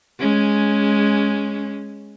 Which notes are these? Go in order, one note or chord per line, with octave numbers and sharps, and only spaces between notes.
G#3 C#4